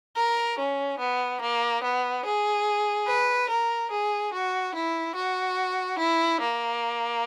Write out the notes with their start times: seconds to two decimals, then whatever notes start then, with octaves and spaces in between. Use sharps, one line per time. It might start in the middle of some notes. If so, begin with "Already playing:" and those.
0.16 A#4
0.58 C#4
0.99 B3
1.41 A#3
1.83 B3
2.25 G#4
3.07 B4
3.49 A#4
3.91 G#4
4.33 F#4
4.75 E4
5.15 F#4
5.99 E4
6.41 A#3